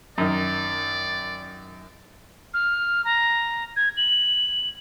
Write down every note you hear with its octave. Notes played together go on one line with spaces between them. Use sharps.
F#2 D#3 D5
F6
A#5
G#6
F#7